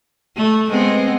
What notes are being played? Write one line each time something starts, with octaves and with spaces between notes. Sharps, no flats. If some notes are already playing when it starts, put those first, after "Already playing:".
A3
G#3 B3 C4